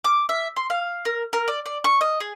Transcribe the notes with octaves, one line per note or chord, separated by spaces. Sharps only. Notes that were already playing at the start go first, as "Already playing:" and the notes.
D6
E5
C6
F5
A#4
A#4
D5
D5
C#6
D#5
G#4